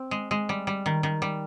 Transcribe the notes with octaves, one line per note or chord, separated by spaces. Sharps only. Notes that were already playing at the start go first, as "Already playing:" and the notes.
Already playing: C4
G#3
G#3
G3
G3
D#3
D#3
G3